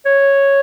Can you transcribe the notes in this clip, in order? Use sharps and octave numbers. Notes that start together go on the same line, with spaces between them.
C#5